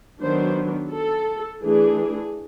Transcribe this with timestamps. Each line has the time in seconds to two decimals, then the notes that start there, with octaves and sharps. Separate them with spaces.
0.21 D#3 F#3 B3 D4 C5
0.92 A4
1.63 E3 A3 D4 G#4